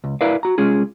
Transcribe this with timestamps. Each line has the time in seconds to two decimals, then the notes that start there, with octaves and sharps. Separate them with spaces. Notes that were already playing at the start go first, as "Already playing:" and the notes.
0.04 C#2
0.21 E4 A#4 B4 D5 E5 F5
0.43 F#4 A#5
0.58 C2 G#3 C#4 F4 G#4